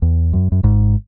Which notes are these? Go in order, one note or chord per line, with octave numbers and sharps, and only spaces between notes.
E2
F#2
F#2
G#1 G#2